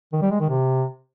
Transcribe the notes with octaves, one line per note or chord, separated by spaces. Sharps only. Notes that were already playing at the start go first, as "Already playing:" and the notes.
D#3
G3
G#3
D#3
C3